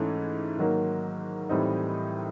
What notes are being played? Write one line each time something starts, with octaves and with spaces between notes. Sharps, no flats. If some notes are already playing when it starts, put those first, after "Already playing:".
Already playing: G#2 E3 A3 C#4 E4
G#2 D#3 F#3 A#3
A2 E3 G3 C4 D#4